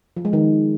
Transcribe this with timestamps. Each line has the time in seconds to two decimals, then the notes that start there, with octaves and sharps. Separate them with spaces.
0.17 F3
0.25 G#3
0.33 D#3